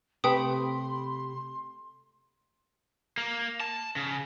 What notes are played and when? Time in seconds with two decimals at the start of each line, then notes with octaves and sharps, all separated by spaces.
0.24 C3 A3 G4 B4 G5 B5 C6 D#6
3.17 A#3
3.60 A5
3.96 C#3